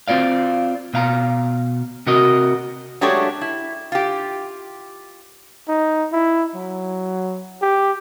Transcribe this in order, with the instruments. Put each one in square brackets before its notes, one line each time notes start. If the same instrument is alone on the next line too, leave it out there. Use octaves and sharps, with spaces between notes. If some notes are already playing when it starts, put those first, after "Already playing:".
[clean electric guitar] C4 F4 D5 F5
B2 F5 A#5
C3 F#4 A#4 D#5
[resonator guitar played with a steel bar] F#3 G#3 A3 D4 G4 C#5
E4
F4 G4
[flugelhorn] D#4
E4
F#3
G4